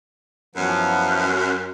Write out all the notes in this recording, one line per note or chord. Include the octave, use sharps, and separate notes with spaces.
F#2 E3 F3 B3